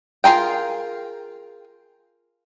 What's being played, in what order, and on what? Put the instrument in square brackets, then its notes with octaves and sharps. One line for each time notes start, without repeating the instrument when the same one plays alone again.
[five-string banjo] F4 G#4 A#4 G5